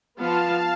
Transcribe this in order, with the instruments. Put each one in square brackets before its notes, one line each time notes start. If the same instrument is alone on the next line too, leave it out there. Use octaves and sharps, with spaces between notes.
[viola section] F3 B3 F4 F5 A5